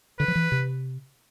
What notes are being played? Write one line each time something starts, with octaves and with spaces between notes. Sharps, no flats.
D3 B4
F3
E3
C3